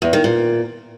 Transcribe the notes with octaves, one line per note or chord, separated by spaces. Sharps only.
E2
D#3
A#2